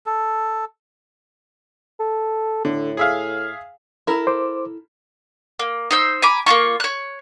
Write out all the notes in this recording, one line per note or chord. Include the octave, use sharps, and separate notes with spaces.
A4
A4
A2 D3
G#4 E5 F5
E4 A4 A#4
C5 D6
A#3
D#4 C5 E6
G#5 A#5 B5 D6
A#3 D#4 F4 C#6
C#5 F#6